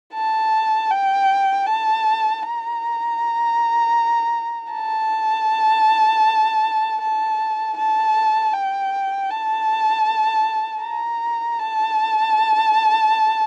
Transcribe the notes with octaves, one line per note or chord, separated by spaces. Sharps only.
A5
G5
A5
A#5
A5
A5
A5
G5
A5
A#5
A5